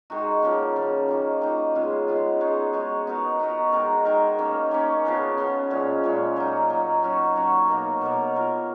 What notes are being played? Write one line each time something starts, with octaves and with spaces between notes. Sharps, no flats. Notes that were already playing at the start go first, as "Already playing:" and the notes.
D#3 G#3 D#4 F#4
C#3 F3 A#3
C#3 F3 A#3
D#3 A#3 D#4 F#4
D#3 A#3 D#4 F#4
C#3 G#3 B3 F4
C#3 G#3 B3 F4
G#3 D#4 F#4 C#5
G#3 D#4 F#4 C#5
B3 D#4 F#4 A#4
B3 D#4 F#4 A#4
D#3 G#3 D#4 A#4
D#3 G#3 D#4 A#4
D#3 A#3 C#4
D#3 A#3 C#4
C#3 F3 B3
C#3 F3 B3
A#2 G#3 C#4
A#2 G#3 C#4
F#3 A#3 D#4
F#3 A#3 D#4
F#3 C#4 F#4 C#5
F#3 C#4 F#4 C#5
B2 A#3 D#4 A#4
B2 A#3 D#4 A#4
A#3 F4 A#4 C#5